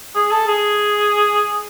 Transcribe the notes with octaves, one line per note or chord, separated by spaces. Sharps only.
G#4
A4
G#4